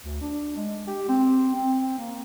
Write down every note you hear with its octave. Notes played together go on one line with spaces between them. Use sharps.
D2
D4
G#3
G4
C4
C4
A#3